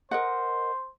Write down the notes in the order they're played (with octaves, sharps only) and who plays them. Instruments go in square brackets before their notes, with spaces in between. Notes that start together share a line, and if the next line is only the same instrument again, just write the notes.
[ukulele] A#4 D#5 F#5 [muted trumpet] C5